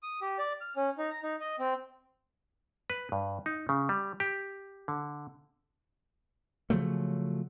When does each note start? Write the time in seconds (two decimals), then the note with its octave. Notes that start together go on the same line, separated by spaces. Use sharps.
0.03 D#6
0.21 G4
0.38 D5
0.61 F6
0.76 C#4
0.98 D#4
1.10 A#5
1.23 D#4
1.40 D#5
1.59 C4
2.90 B4
3.12 G2
3.46 D#4
3.69 C#3
3.89 G3
4.20 G4
4.88 D3
6.70 C#3 F3 F#3 A3